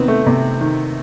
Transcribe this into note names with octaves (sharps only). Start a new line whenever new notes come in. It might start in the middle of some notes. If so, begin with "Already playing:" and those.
Already playing: C3 D#3 B3 C4
A3
C3
D#3